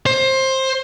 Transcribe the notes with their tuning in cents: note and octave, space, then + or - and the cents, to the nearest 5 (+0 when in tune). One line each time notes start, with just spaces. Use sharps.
C5 +20